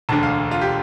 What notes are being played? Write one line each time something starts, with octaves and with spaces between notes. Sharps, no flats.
E1 D2 D3 A5
F5
F4
G4